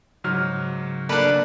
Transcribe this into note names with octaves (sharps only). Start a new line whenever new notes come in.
G#2 C#3 F#3 F6
A#3 D4 A4 B4 D5